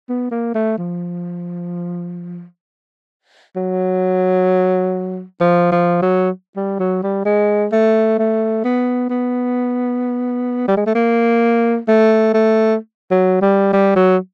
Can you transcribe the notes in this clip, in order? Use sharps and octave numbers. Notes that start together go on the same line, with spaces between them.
B3
A#3
A3
F3
F#3
F3
F3
F#3
G3
F#3
G3
G#3
A3
A3
B3
B3
G3
G#3
A3
A#3
A3
A3
F#3
G3
G3
F#3